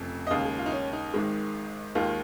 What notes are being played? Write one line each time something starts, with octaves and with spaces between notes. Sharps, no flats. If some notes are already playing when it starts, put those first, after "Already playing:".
Already playing: F1 F2 C#3
D#5
D#2 C#3 G#3 F5
G#4
F4
D#4
C#4
D#4
G#1 G#2 D#3 G#3
D#2 D#3 G#3 F4